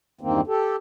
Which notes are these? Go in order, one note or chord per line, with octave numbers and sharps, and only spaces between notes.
E2 G2 D#3 A#3 C4
G4 A4